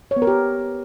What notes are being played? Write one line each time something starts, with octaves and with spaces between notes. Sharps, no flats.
C#5
B3
A#4
G4